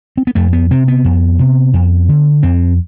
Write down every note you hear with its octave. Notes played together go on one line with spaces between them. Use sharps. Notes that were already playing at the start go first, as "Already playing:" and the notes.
C4
B3
F2 A3
B3
C3 C4
B3
F2
C3
F2
D3
F2 C4